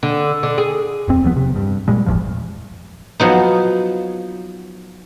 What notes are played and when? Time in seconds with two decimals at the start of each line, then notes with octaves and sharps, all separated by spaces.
0.03 D3
0.43 D3
0.58 G#4
1.08 D#1 F2 C4
1.24 D#2 F3 B3
1.36 C3
1.56 G2
1.88 A#2 G3 G#3
2.06 G1 E2 A2 F3
3.20 F3 F#3 B3 D#4